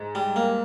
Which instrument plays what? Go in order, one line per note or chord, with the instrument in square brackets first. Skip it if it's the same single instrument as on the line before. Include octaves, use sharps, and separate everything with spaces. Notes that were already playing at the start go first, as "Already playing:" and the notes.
Already playing: [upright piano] G#2
[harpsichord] G3
A#3